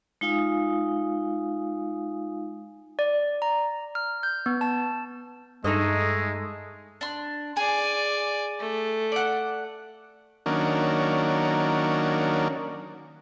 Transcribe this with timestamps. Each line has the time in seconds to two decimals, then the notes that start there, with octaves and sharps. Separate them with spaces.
0.21 G#3 D#4 F4 F5 G#5 D#6
2.99 D5
3.42 A#5
3.95 F6
4.23 G6
4.46 B3
4.61 A5
5.64 G2 G#3 A3 D#4 A4 D#5
7.01 D4 C6
7.57 G#4 D5 G#5
8.60 A3
9.12 D5 F#5
10.46 D#3 F#3 A#3 C#4 D4